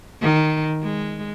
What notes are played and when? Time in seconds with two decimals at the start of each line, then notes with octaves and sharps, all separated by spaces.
0.22 D#3
0.83 G#3